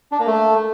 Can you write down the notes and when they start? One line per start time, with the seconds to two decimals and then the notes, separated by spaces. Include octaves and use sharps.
0.12 D4
0.19 A#3
0.27 A3